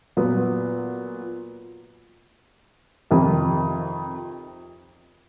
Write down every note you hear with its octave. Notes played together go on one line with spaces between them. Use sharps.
A#2 F#3 B3
F2 C3 D#3